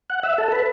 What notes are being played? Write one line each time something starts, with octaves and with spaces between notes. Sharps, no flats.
F#5
E5
A4
B4